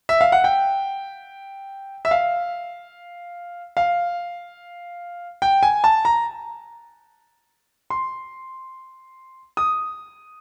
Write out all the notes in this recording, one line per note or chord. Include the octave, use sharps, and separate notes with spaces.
E5
F5
F#5
G5
E5
F5
F5
G5
G#5
A5
A#5
C6
D#6